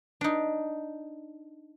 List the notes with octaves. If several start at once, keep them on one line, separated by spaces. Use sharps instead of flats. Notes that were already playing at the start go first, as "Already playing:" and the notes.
D4 D#4